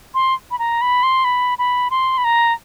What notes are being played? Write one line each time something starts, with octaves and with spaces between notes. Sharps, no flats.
C6
B5
A#5
B5
C6
B5
B5
C6
B5
A#5